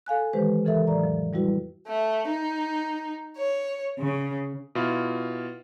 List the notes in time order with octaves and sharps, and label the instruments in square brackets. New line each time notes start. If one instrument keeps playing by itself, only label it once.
[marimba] A4 F5 G#5 F#6
D#3 E3 G#3 G4 B4 C5
C#3 E3 A4 A#4 E5
F2 A2 F#3 D5 A#5
F3
F3 G3 E4 F#4 B4
[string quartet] A3
D#4
C#5
C#3
[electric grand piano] B2 E4 F4